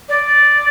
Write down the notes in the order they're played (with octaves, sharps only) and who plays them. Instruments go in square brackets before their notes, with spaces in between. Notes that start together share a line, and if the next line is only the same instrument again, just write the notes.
[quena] D5